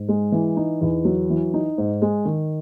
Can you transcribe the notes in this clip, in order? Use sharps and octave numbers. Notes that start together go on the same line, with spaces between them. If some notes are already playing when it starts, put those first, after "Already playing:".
Already playing: G#2
G#3
E3
D#4
E2
F#3
E3
D#4
G#2
G#3
D#3